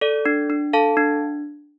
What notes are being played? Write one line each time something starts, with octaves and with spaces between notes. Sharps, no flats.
A4 D5
D4
D4
A4 F5 A5
D4